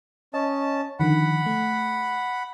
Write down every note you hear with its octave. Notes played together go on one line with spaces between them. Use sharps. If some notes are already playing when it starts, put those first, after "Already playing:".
C#4 D#5 A5
D3 D#3 F3 F#5 B5
A3